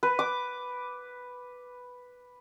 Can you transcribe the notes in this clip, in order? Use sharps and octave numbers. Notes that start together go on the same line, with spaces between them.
B4
D6